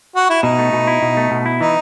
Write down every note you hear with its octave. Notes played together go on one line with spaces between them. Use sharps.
F#4
E4
B2 D#4
A3
B2
E4
B2
A3
B2
E4
E3 D#4